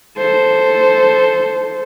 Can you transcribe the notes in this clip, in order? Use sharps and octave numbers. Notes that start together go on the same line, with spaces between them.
A4 C5